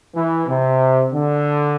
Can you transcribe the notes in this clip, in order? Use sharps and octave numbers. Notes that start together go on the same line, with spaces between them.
E3
C3
D3